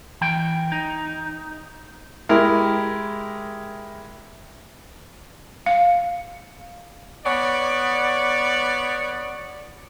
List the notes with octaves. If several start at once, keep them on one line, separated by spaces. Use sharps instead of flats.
E3 G5
D#4
G#3 E4 G4 A#4
F5
B3 C#5 D5